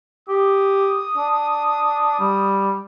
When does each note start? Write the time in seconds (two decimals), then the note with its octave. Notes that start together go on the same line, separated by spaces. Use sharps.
0.29 G4 D#6
1.17 D4
2.19 G3